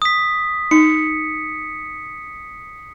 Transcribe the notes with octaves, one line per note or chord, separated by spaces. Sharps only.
D#6 B6
D#4 C#7